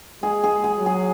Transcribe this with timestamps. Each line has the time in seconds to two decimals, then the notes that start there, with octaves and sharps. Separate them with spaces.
0.22 G#3 G#4
0.44 G#4
0.64 G#4
0.78 F#3
0.86 G#4